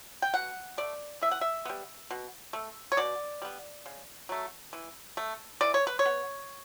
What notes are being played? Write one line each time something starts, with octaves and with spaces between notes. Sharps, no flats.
G5
B2 F#5
A3 D5
E3 E5
F#5
E5
G3 B3
B2
A3
C#5
B2 D5
G3 B3
C#3
F#3 A3
E3
A3
E3 D5
C#5
B4
C#5
B3